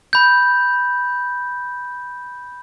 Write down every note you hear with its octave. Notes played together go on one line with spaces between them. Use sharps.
B5 G6